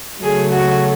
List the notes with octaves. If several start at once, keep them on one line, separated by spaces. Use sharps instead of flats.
C#3 F#3 A3 G#4
F#4